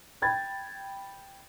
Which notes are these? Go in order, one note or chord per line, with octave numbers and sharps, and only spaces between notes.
G5 B5 G#6 A6